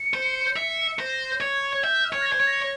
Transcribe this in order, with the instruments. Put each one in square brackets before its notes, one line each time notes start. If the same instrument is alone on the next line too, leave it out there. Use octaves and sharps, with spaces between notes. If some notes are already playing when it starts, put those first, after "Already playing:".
Already playing: [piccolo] C#7
[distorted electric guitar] C5
E5
[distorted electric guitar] C5 [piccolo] A#6
[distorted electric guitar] C#5 [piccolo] G#6
[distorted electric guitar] E5 [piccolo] G6
[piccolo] F6
[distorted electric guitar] C#5
[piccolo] A#6
G#6
[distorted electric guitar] C5
C#5
[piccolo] A#6